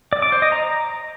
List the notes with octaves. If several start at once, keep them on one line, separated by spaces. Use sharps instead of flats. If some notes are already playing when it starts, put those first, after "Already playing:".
D5
D6
C5
D#5
A#5